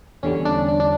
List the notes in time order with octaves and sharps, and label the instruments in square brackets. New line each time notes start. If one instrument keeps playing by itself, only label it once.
[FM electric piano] E2 D3 G3 C#4
D4
D4
D4